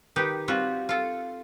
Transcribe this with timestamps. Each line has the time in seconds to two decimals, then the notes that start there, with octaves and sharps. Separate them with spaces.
0.16 D#3 D#4 G4 B4
0.48 G3 C4 F4 F#4
0.89 F4 A4